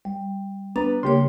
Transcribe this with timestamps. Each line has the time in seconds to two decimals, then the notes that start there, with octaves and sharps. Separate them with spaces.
0.05 G3
0.76 B3 D4 B4 A#5 A6
1.03 C#3 A#3 G4 C#5 C6